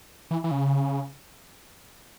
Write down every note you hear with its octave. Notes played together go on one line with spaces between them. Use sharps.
E3
E3
C#3